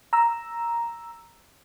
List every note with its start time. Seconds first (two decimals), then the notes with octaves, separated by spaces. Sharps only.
0.13 A#5 E6